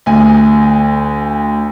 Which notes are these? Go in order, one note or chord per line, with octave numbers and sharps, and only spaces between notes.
D2 G#5